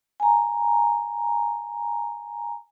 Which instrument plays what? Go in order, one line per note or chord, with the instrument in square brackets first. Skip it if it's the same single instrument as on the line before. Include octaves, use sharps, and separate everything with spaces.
[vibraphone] G#5 A#5